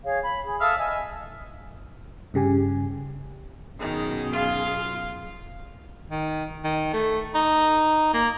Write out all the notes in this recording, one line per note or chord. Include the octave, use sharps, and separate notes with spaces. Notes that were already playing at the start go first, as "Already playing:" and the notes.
G#4 C#5 F5
B5
G#4
A4 E5 F5 D#6
D#5 E5 G#5
G2 C#3 G4 G#5
F#2 B2 D#3 G#4
F4 F5
D#3
D#3
A3
D#4
A#3